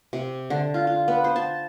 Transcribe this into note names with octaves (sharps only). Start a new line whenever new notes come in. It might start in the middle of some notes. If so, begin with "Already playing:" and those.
C3
D3
F4
F4
B3
C5
A5